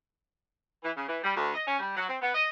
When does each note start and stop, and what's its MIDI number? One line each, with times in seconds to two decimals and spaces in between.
0.84 0.91 52
0.95 1.04 49
1.08 1.19 52
1.24 1.32 55
1.36 1.53 38
1.54 1.62 75
1.67 1.79 61
1.79 1.93 55
1.95 2.06 54
2.08 2.16 60
2.21 2.31 59
2.34 2.47 75